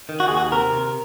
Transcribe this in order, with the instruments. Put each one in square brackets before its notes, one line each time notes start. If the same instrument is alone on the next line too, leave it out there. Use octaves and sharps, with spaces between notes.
[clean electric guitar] D#3
F#4
D#2 G#4
F#4
C3 A#4
C3